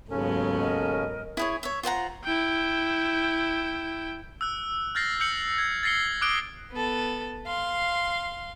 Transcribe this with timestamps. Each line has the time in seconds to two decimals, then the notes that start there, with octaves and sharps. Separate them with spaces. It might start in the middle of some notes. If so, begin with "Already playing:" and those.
0.11 D#2 G#2 C#3 F#3 B3 C#4 A4
0.59 A#4 D#5
1.37 E4 G#4 C#5
1.63 C#5 E5
1.83 F4 C5 F#5 A#5
2.24 E4 G5
4.41 E6 F#6
4.95 F6 G6 A6 A#6 C7
5.20 E6 G6 C#7 F#7
5.58 G#6
5.83 A6 A#6 C7 C#7 G7
6.21 D6 D#6 F#6 D7 G7
6.72 B3 A4
7.46 F5 C6